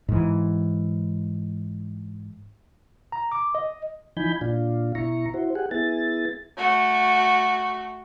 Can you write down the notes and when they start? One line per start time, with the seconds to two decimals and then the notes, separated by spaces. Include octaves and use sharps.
0.09 G#2 E3
3.12 A#5
3.32 D6
3.55 D#5
4.17 E3 F3 D#4 G#5 B5 G6
4.41 A#2 D4 F4
4.95 B2 E4 A#5 C#6
5.34 E4 F#4 C5
5.55 G4 G#4 F#5
5.71 B3 E4 G#4 A6
6.57 A3 F#4